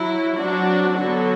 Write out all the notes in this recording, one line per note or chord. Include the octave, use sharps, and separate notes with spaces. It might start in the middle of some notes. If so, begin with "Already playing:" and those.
Already playing: F#3 E4
F#3 C4 D4 F#4
D3 F#3 B3 F#4 A4